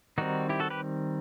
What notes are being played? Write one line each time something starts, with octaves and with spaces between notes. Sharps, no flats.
D#3 G3 C4 D#4 F#4
E4 G4
F#4 A4
G4 B4